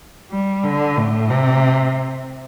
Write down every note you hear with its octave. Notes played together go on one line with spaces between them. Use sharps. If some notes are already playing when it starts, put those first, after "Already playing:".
G3
D3
A2
C3